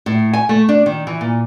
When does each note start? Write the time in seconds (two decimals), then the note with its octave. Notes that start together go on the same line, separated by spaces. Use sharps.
0.06 A2
0.33 G#5
0.49 A3
0.69 D4
0.86 D#3
1.07 E3
1.21 A#2